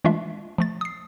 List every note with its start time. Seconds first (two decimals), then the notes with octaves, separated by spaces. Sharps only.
0.05 E3 G#3 A3 D4 F4 E5
0.58 F3 A3 A6
0.81 D#6 C7